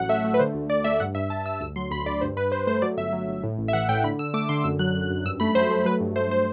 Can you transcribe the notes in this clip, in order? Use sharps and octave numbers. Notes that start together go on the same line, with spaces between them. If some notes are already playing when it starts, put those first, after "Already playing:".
Already playing: A1 F#3 F#5
A3 E5
A3
B4
D3 C5
D2
D2 D5
A3 E5
G2 F#5
G2 E5
G2 A5
G2 E6
D2 E6
F#3 C6
D2 B5
D2 D5
G2 C5
G2 B4
G2 C5
A3 C5
F#3 D5
G1 E5
F#3
G1
A2
A1
E5
E3 F#5
A2 G5
D3 B5
D3 E6
A3 D6
D3 C6
F#2 E6
F#3 F#6
F#2
F#2
G2 E6
A3 B5
F#3 C5
A3
F#3 B4
G2
A3 C5
C5